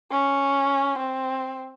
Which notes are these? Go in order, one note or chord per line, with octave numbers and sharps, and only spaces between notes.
C#4
C4